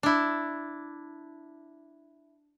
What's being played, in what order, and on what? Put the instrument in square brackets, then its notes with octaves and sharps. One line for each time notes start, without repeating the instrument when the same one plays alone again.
[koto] D4 E4